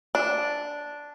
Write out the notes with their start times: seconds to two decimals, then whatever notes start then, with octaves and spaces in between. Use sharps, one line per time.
0.15 D4